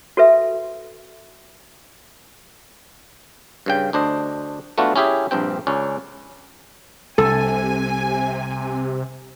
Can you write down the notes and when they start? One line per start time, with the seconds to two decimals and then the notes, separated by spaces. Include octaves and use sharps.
0.17 F#4 A4 B4 E5
3.66 G2 C#3 G5
3.93 D2 D4 C5 D#5
4.78 A3 B3 D4 F4 F#4
4.96 C#4 E4 G4 G#4 E5
5.31 A#1 G2 C4 G5
5.67 C#2 C#4 D5
7.18 C2 C3 A4 G#5